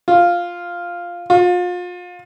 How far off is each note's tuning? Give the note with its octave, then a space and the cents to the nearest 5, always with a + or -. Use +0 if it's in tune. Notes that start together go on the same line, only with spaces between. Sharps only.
F4 +0
F4 +35